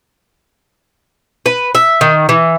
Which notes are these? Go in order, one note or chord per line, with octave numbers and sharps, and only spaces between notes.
B4
E5
D#3
E3